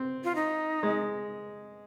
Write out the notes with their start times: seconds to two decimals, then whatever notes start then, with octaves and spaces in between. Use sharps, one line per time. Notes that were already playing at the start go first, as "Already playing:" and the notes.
Already playing: C4
0.24 F4
0.35 D#4
0.83 G#3